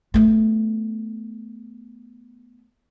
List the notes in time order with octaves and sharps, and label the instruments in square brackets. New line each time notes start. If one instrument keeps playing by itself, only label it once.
[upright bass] A3 B3